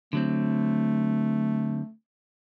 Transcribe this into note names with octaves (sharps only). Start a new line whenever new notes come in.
D3 F#3 A3 C4